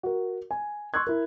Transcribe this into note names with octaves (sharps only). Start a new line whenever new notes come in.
F#4 A#4
G#5
C6 C#6 E6 F#6 G#6
E4 A#4